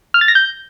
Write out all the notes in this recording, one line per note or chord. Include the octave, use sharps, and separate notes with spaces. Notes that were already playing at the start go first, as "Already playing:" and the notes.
F6
A6
A#6
G6